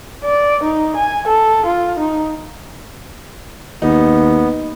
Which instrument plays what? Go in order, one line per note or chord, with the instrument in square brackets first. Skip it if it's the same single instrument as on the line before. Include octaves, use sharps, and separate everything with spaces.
[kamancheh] D5
D#4
G#5
A4
F4
D#4
[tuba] D#2 [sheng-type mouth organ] B3 [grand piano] D#4